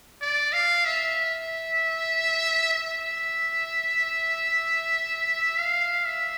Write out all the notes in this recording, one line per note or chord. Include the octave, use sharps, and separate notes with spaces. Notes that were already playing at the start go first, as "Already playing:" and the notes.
D5
F5
E5
E5
F5
E5